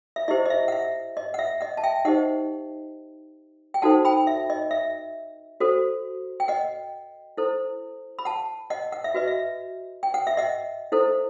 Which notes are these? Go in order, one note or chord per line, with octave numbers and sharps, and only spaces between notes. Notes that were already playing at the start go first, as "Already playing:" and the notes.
E5
E4 G4 C5 D#5
D#5
E5
F#5
E5
D#5
F#5
E5
D#5 F#5
A5
E5 G5
D#4 G4 C5 D#5 F#5
G5
D#4 F#4 A4 C5 F#5 A5
G5 B5
E5
D#5
E5
F#4 A4 C5
G5
D#5 F#5
E4 A4 C5
B5
F#5 A5
D#5 F#5
F#5
E5
F#4 B4 D#5
E5
G5
F#5
E5
D#5 F#5
E4 A4 C5